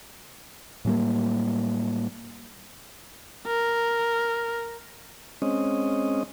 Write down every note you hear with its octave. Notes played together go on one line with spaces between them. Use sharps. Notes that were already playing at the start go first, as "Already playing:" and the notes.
A2 F#3 G3 A#3
A#4
G#3 C4 C#4 D#5